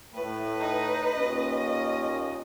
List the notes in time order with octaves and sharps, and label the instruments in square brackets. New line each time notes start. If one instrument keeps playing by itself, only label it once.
[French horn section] A2 [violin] B4
[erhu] D#4
[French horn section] D#2 A#2 C#4 [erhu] D#5